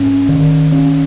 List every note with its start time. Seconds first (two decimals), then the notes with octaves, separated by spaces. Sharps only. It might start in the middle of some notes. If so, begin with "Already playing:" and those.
Already playing: G#2 C#4
0.29 D#3
0.72 C#4